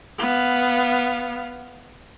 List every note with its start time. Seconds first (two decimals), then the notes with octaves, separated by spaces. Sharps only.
0.18 B3 F5